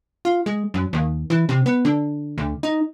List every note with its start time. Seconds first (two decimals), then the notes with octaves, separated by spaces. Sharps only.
0.25 F4
0.46 G#3
0.74 F#2
0.93 D#2
1.30 E3
1.49 C3
1.66 B3
1.85 D3
2.38 D2
2.63 D#4